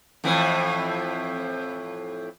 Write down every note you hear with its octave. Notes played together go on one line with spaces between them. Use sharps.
F2 A2 E3